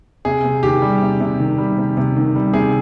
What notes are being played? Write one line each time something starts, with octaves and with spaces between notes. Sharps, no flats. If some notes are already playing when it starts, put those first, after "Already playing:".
C3 G#4
C3
D#3 G4
G3
C3
C3
D#3
G3
C3
C3
D#3
G3
C3 G#4